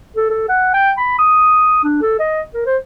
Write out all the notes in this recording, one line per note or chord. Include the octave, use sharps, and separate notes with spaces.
A4
A4
F#5
G5
B5
D#6
D4
A4
D#5
A#4
C5